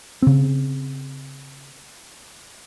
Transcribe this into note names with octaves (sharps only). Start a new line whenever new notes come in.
C#3 C4